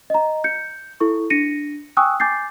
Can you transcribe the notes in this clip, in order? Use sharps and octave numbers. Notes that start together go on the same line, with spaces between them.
D#5 A#5
G6 C#7
E4 A4 C#6
D4 A#6 C#7 D#7
G5 G#5 C#6 D#6 E6 F#6
G#5 D6 G6 A6 C7